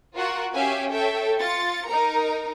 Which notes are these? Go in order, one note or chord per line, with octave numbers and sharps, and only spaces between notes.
F4 F#4 A#4 F#5 C#6
C#4 G4 E5 F5 G#5
A4 C#5 E5 G5
F4 A6 C#7
D#4 A#4 A#5